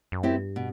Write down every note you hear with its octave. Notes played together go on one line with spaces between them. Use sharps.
F#2
C4 E4 G4
G2
B2